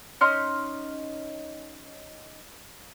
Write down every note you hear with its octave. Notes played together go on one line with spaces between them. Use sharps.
C#4 D#4 C6 F6